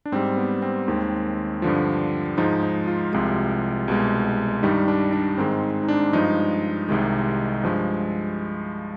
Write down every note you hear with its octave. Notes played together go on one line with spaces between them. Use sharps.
D4
G#2 G3 C4
B3
C4
D#2 D#3 G#3
G2 D3 F3
G#2 F3 G#3 D#4
D#4
F4
C2 C3 F3 G#3
C2 B2 G#3
G2 D#3 G3 D#4
D4
D4
G#2 D#3 G#3 C4
D#4
D4
G2 F3 G#3 D#4
C2 C3 D#3 G#3
G2 F3 G#3